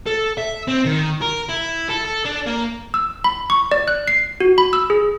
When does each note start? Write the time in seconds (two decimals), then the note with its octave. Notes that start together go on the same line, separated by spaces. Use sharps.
0.06 A4
0.38 E5
0.68 C4
0.85 D#3
1.21 A#4
1.49 E4
1.89 A4
2.05 A4
2.25 D4
2.46 A#3
2.94 E6
3.24 B5
3.50 C#6
3.71 D5
3.88 F#6
4.08 C7
4.41 F#4
4.58 B5
4.73 E6
4.90 G#4